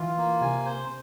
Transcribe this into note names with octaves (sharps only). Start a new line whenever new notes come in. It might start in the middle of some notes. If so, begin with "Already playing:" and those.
Already playing: E3 F4
A#3
C3 G#5
C5